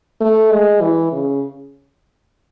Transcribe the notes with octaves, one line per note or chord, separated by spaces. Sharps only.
A3
G#3
E3
C#3